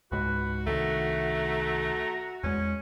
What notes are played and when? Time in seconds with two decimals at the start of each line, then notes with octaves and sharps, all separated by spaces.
0.12 C#2 G#2 F#4 B4
0.67 C2 D#3 A3 A#5
2.44 E2 G#3 C#4